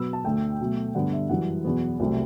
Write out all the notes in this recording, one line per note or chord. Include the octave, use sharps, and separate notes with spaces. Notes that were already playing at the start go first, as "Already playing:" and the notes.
Already playing: B2 F#3 B3 E6
A5
D2 D3 A3 G5
B2 F#3 A3
G2 D3 G3 B3 F#5
E5
F#2 E3 G3 F#5
E2 B2 F#3 B3
C2 C3 F#3 A3